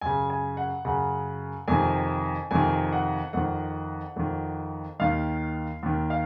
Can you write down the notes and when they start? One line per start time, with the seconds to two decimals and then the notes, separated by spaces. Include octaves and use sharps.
0.01 F#2 C#3 G#5
0.30 G#5
0.57 F#5
0.85 F#2 C#3 F#5
1.68 F2 C3 D#3 G#5
2.51 F2 C3 D#3 G#5
2.93 F#5
3.33 F2 D#3 F#5
4.16 F2 D#3
5.00 D#2 D#3 F5
5.83 D#2 D#3
6.10 F5